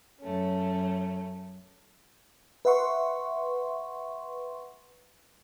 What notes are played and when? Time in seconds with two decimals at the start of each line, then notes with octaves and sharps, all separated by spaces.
0.21 F#2 A3 C#4
2.65 B4 E5 F#5 C6 C#6